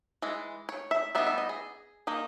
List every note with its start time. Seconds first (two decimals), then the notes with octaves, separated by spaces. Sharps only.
0.22 E3 G#3
0.69 C#5
0.91 E5
1.15 G3 B3 D#4 E5
1.27 E5
1.38 D#5
1.49 G#4
2.07 D#3 A#3 D#4